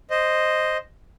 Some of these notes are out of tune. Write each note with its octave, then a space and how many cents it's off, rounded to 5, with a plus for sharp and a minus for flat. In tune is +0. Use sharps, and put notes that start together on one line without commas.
C5 +0 D#5 -5